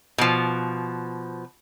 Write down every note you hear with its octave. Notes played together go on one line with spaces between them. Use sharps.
B2 F3